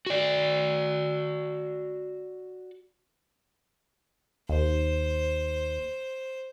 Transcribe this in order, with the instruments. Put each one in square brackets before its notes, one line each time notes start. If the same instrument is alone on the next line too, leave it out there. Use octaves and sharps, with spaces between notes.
[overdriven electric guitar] F#4 D5
[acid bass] D#2 [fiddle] C5